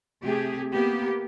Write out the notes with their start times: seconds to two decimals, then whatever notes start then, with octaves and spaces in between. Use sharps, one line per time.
0.23 C3 A3 G4 G#4
0.73 A#3 B3 G4